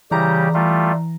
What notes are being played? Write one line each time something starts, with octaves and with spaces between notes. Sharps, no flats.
C#3 E3 G3 G4 A#5
G3 A3 F4